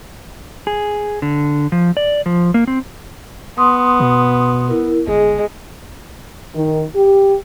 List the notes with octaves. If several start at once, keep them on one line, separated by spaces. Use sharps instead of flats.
G#4
D3
F3
D5
F3
A#3
C4
B3 C6 D#6
B2
E4 A#4
G1 G#3 G#4 D#5
D#3
G4